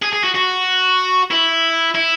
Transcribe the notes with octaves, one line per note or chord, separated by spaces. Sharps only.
G#4
G#4
F#4
F#4
E4
E4